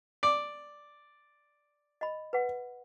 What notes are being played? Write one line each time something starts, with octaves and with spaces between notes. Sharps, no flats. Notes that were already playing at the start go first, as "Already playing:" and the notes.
D5
D#5 B5
B4 F#5